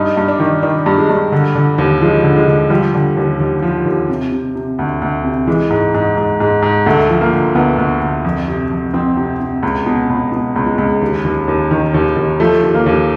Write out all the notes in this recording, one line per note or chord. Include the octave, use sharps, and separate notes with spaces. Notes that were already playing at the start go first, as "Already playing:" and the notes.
Already playing: G2 D#4
G2
D4
D#3
D#3 D4
G2
G#3
G2
D3
D3
D#2
F3 G#3
D3
G#3
D3
F3 G3
D3
D#2
D#2
F3
D#2
C3
C3
C3
D2
D2
C3
E3 G#3
G#2
G#2
G#2
G#2
G#2
D2 A3
F3
A#3
D2
D2 B3
D2
D2
F2
C3
F2
F2 C4
C3
C3
C#2
B2
C#2
B2
C#2
G#3
C#2
D#2
D#2
D#2
D#3
D#2
D#2
F3 A3
D#2
A#3
D#2